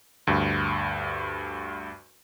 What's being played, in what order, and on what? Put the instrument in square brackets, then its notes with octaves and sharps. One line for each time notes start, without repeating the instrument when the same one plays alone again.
[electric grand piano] D2 G2